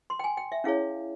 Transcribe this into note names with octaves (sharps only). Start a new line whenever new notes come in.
C6
G5
G#5
G5
E5
C#4 E4 G#4 C#5 F5